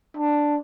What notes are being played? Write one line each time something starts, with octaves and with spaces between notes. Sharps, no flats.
D4